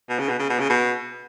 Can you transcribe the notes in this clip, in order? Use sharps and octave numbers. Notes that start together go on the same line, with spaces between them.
B2
C#3
B2
C#3
B2
C#3
B2